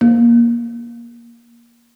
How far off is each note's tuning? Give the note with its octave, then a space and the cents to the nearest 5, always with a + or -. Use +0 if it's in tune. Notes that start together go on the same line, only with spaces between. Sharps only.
A#3 +15